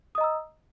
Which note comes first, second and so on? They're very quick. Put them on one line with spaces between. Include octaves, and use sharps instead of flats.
D#6 D#5 A#5 E6